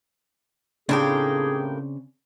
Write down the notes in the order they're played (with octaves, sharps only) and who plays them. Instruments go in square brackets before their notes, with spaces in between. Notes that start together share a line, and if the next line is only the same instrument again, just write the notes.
[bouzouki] A2 A#3 G4 [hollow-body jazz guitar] C#3 C4 D4 [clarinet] G#4